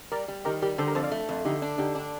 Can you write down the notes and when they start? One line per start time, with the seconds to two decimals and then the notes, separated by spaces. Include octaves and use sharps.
0.12 G3 A#4 D5
0.28 G3
0.45 D#3 G4 A#4
0.62 G3 G4 A#4
0.78 D3 A4 C5
0.87 G4 A#4
0.95 F2 A4 C5
1.03 D5 F5
1.11 A3
1.29 F2
1.45 D3 D#4 G4
1.62 D4
1.78 D3 D#4 G4
1.95 D4